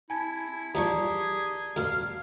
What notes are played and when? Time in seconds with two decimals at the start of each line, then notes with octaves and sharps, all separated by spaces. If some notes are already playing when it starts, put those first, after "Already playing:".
0.10 E4 G#5 A5 G#6
0.75 D#2 F3 G4 G#4 D5 A5 A#5 C#6
1.76 D2 B2 F5